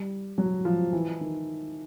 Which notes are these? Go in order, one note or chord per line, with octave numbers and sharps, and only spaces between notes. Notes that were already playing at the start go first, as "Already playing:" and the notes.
Already playing: G3
F#3
F3
E3
D#3